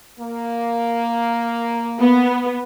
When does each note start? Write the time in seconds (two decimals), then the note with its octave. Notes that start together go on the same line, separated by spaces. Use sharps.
0.20 A#3
2.00 B3